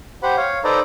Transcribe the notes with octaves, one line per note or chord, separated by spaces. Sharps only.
G4 C5 F#5 B5
C#5 F5
D#4 A4 B4 C5 D5 A#5